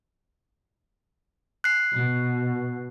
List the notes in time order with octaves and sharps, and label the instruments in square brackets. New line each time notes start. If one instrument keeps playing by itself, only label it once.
[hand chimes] F#6 C7
[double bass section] B2